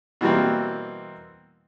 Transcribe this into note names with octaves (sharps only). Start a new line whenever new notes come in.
B2 E3 G3 A#3 C4